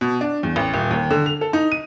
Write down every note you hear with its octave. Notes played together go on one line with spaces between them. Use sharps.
B2
D4
E2
A1
D#1
D#2
D3
F7
A4
D#4
D#7